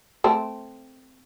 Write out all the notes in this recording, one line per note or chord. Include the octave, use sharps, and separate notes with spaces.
A3 C4